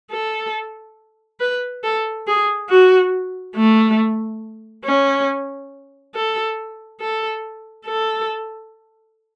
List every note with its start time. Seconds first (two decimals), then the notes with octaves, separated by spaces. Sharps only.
0.11 A4
1.40 B4
1.84 A4
2.27 G#4
2.69 F#4
3.56 A3
4.85 C#4
6.15 A4
7.01 A4
7.86 A4